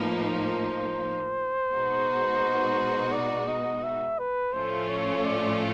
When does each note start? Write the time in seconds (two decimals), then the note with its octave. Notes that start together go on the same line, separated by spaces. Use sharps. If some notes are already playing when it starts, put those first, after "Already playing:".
Already playing: A2 F3 A#3 D#4 B4
0.29 C5
1.71 B2 G#3 B3 D#4 F#4
3.12 D5
3.48 D#5
3.84 E5
4.19 B4
4.53 A2 F3 A3 C#4 F4 C5
4.89 C#5
5.25 D5